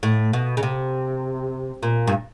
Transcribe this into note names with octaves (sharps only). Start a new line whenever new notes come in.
A2
B2
C#3
C3
A#2
G2